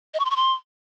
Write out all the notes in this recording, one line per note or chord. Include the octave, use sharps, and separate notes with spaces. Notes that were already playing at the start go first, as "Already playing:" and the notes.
D#5
C#6
C6
C#6
C6